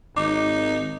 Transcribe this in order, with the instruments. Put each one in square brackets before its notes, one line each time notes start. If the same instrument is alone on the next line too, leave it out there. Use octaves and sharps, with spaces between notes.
[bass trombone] G#1 [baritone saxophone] D#4 [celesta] D6